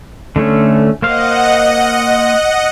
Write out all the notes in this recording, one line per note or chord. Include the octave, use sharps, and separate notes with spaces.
D3 A3 C#4
A#3 C5 D#5 F5 F#5